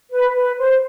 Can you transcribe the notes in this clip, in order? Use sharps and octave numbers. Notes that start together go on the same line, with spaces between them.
B4
B4
C5